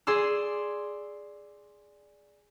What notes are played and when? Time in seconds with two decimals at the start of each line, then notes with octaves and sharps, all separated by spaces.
0.07 G#4 D5 C6 E6